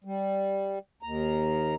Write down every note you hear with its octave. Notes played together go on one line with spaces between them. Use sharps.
G3
D#2 A#5